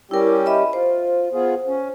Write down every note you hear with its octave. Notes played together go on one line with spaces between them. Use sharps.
G3 C#4 E4 G4 A#4
D#5 E5 B5
F4 C5
B3 F4 G#4
C#4